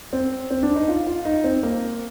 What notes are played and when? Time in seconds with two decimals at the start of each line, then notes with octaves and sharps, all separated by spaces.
0.13 C4
0.51 C4
0.63 D4
0.76 D#4
0.88 F4
1.07 F4
1.25 D#4
1.44 C4
1.63 A#3